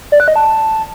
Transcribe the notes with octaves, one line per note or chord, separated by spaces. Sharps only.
D5
F#6
D#5
A5